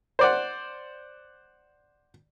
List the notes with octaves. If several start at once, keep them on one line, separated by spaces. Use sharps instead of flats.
C5 D5 F#5